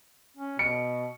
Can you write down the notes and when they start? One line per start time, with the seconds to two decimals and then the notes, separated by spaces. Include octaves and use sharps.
0.37 C#4
0.59 B2 C#7 D7